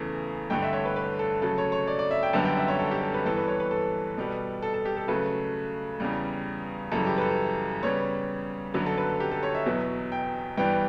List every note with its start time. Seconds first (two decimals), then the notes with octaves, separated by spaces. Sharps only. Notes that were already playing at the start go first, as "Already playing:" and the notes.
Already playing: E2 C#3 E3 A3
0.50 G2 D3 A3 G5
0.62 E5
0.73 C#5
0.85 B4
0.96 B4
1.19 A4
1.42 C#3 F#3 A3 A4
1.58 C#5
1.72 C#5
1.87 D5
1.99 D5
2.11 E5
2.23 G5
2.33 F#2 D3 G3 B3 A5
2.45 G5
2.57 E5
2.68 C#5
2.79 A4
2.91 G4
3.02 A4
3.14 B4
3.25 G2 E3 B3 A4
3.37 B4
3.48 C#5
3.60 B4
3.71 A4
4.17 B2 G3 B3
4.63 A4
4.74 A4
4.85 G4
4.97 A4
5.08 C#3 F#3 A3 B4
6.00 E2 C#3 G3
6.92 F#2 C#3 E3 G3 A4
7.07 G4
7.18 B4
7.21 A4
7.83 C#3 G3 B3 C#5
8.74 F#2 D3 F#3 B3 B4
8.86 A4
8.98 B4
9.09 A4
9.20 G4
9.31 A4
9.43 C#5
9.55 E5
9.66 E2 B2 F#3 B3
10.12 G5
10.57 G2 E3 G3 B3 G5